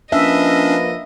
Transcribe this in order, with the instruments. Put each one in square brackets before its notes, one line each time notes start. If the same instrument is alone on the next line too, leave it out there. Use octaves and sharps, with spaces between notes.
[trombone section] F3 A#3 B4 [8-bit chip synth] C#4 D4 [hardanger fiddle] D#5 [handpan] E5